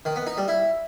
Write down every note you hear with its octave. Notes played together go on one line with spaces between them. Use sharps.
D#3
B3
D#4
G3
E4